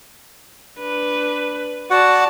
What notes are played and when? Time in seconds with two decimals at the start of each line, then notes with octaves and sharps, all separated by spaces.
0.79 D4 B4
1.90 F#4 D5 F#5 A5